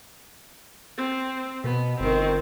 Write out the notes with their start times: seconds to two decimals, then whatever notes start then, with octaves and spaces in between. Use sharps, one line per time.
0.98 C4
1.64 B2 B3
2.00 G1 D#3 C4